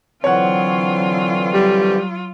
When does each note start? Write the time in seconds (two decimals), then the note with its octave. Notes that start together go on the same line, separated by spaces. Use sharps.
0.24 D3 E3 F#3 C4 F4 C#5 F#5
1.54 G3